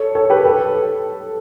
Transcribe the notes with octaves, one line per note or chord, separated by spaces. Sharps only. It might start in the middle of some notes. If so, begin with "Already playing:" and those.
Already playing: A4 C#5
A4 C#5
G4 B4
A4